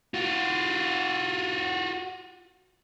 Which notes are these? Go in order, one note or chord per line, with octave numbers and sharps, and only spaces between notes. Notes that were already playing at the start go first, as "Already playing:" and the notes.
F4 F#4